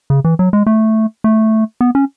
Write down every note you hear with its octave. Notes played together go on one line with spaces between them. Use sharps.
C#3
E3
F#3
G#3
A3
A3
B3
C#4